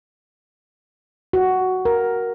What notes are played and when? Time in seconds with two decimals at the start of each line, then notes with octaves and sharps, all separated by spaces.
1.33 F#4
1.85 A#4